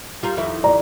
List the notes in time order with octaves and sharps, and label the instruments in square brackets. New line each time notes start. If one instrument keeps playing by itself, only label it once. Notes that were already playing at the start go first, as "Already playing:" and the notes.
[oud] G3 F4 A#4
F2 D#3 E4
[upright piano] D5 A#5